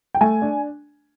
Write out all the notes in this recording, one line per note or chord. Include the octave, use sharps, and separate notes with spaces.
G5
A3 G#5
D4